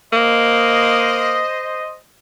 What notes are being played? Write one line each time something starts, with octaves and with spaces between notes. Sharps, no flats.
A#3 C5 D#5